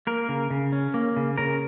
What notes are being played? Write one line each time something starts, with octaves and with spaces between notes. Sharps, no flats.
A#3 A#4
C#3
C#3
C#4
A#3
C#3
C#3 A#4